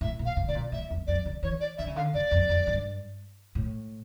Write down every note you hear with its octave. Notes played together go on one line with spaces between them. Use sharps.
A2 E5
A#2
F5
C#3
C#3 D5
A#2
A2 E5
E2
F2 D5
C#3
E3 C#5
D5
D3 E5
C#3
D3 F5
C#3 D5
F2
F2
G2
A2